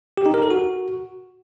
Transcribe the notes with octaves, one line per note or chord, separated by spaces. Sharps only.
G4
D#4
A#4
A4
F#4